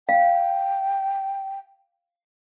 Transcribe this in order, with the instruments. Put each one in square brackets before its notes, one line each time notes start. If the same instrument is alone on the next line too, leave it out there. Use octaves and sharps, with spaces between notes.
[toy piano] F5 [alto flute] G5